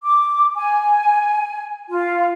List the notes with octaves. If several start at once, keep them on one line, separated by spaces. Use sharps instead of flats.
D6
G#5
F4